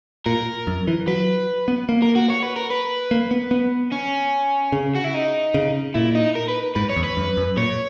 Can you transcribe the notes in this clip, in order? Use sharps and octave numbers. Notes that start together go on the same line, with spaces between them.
A#2 A#4
F#2
E3
F#3 B4
B3
A#3
A#4
F#4
C#5
B4
A#4
B4
A#3
B3
B3
C#4
C#3
F#4
E4
D#4
C#3
A#2 E4
D#4
A#4
B4
G#2 B4
C#5
E2
B4
F#2
F#2
A#2 C#5